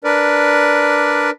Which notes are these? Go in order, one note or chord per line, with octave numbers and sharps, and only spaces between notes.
D4 A#4 B4 D5